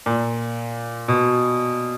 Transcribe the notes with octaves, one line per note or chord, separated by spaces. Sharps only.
A#2
B2